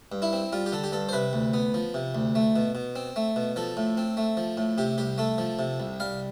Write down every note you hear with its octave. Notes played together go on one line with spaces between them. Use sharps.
G2
E4
C4
G3 F4
G4
D3 A4
G4
G2 A4
C5
C3 B4
D2
B3
F3
C3
D2
A3
B2
B2
C4
A3
B2
F3 A4
A2
C4
A3
F3
A2
C3 G4
C2 G4
A3 A4
F3
C3
C2
G3 F5